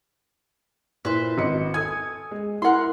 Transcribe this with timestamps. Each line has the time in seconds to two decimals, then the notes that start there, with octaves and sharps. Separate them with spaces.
1.05 A#2 E4 B4 C5
1.38 G#1 D#5 C#7
1.74 A4 G#5 D#6 G#6
2.31 G#3
2.62 E4 A#4 F#5 C6